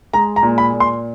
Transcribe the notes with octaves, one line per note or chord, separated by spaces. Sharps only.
G#3 A#5
A#5
A#2
B5
A#2
C6